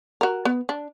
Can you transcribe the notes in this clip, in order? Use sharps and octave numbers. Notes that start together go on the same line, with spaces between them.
F#4 A#4
B3
D4